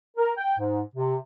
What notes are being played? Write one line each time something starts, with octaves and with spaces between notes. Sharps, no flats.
A#4
G5
G#2
C3